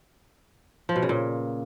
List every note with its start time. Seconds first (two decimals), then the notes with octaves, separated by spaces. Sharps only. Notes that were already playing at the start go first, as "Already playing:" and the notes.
0.89 F3
0.96 B2
1.02 C#3
1.09 A#2